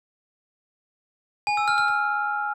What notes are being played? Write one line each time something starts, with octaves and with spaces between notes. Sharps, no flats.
G#5
E6
F6
F6
F6